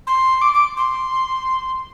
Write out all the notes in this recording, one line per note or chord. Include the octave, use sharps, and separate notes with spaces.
C6
D6
D6
C6